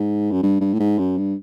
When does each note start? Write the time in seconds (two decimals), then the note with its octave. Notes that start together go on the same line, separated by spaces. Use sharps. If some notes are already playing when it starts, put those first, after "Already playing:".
Already playing: G#2
0.31 F#2
0.43 G2
0.61 G2
0.73 A2
0.80 G#2
0.99 F#2
1.18 G2